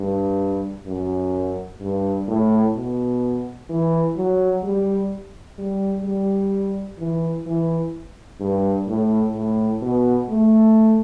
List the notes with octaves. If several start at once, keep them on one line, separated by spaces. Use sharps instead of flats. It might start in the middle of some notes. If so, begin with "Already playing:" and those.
Already playing: G2
F#2
G2
A2
B2
E3
F#3
G3
G3
G3
E3
E3
G2
A2
A2
B2
A3